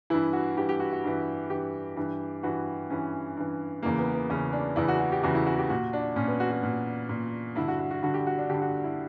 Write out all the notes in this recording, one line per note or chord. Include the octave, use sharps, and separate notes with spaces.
G2 E3 E4
F#4
G2 E3 G4
G4
F#4
F#4
G2 E3
G2 E3 G4
G2 E3
G2 E3 F#4
G2 E3 C#4
G2 E3
E2 C#3 E3 A#3
B3
B3
E2 C#3 E3 C#4
D4
E2 C#3 E3 E4
F#4
F#4
G4
E2 C#3 E3 F#4
E4
F#4
G4
A#2 F#4
D4
A#2 C#4
B3
F#4
F#4
A#2
A#2
G2 D3 E4
F#4
F#4
F#4
G2 D3 F#4
G4
F#4
D4
G2 D3 G4
F#4
E4